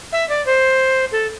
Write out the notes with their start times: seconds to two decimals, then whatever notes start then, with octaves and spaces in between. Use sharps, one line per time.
0.12 E5
0.29 D5
0.46 C5
1.12 A4